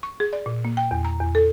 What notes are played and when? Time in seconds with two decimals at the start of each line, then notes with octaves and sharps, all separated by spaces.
0.03 C#6
0.20 G#4
0.33 D5
0.46 A#2
0.65 A#3
0.77 G5
0.91 E2
1.05 A#5
1.20 E2
1.35 A4